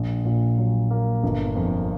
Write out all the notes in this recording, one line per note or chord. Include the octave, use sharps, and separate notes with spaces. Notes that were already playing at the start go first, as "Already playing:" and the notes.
Already playing: A#1
A#2
F#3
A#3
G1
F2